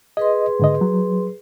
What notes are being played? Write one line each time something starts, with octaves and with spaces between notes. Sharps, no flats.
G#4 B4 D#5 C6
G#2 D3 D#5
F#3